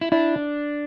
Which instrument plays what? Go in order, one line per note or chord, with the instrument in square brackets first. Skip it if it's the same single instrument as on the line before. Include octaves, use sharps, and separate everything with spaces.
[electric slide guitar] E4
[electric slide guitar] D4 [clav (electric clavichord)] E4